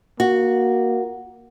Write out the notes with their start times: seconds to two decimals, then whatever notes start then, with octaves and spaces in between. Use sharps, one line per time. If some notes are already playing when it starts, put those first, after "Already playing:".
0.20 A#3 F#4